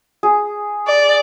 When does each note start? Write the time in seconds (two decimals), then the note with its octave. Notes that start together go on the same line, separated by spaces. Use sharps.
0.23 G#4
0.88 D5